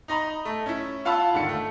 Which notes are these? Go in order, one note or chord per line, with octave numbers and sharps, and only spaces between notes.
D#4 D#5 A#5 B5
A3
C#4 E4
F4 F5 F#5 A5 B5 E6
D#2 G#2 D3 C#7
A3